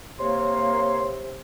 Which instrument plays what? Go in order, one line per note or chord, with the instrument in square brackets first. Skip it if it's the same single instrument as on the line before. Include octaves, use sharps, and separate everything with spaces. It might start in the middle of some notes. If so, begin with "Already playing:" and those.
[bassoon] C3 [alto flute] A#3 [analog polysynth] C#5 [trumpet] C6